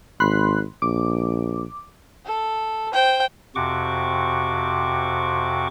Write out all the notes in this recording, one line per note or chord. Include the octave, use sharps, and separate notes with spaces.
G#1 B5 C6 F#6
A#1 D6
A4
C5 G5
F2 C3 F#4 C#6 D6